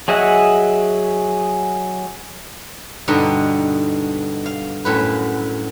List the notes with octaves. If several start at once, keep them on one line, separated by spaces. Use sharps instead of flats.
F#3 G#4 D#5 E5 F#5
G2 B2 D3 B3 D#4
F5
F#2 A2 B4